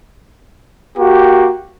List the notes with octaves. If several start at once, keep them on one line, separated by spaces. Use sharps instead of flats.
A#3 F#4 G4